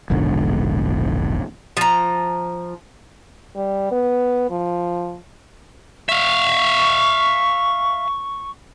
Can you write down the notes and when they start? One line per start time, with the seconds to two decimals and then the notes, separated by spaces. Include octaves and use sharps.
0.10 E1 A#1 G#2 D3
1.77 F3 A#5
3.56 G3
3.92 B3
4.50 F3
6.09 E5 F5 C#6